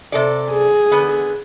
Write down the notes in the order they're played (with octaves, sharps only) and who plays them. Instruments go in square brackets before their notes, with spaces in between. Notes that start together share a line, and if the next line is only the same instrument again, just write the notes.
[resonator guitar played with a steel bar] C3 A4 D5
[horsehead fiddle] G#4
[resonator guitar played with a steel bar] D3 B3